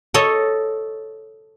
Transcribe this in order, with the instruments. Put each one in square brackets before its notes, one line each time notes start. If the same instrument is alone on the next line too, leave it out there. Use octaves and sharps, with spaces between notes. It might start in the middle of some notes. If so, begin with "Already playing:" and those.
[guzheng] A4 C#5 D#5